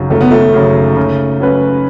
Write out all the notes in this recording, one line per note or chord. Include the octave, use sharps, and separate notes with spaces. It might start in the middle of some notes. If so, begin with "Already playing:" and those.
Already playing: G#1 F#2 C#3
G#1 A3
B3
A3
F#2 C#3
C#3
F#3 C#4 F#4 B4